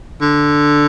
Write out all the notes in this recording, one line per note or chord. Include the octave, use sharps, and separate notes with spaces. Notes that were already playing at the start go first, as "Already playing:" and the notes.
D3